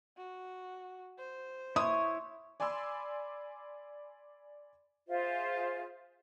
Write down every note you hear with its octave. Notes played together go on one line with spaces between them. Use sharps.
F#4
C5
E4 C#5 E5 C6 C#6 D#6
D5 G#5 B5 C6 E6
F4 G#4 C5 E5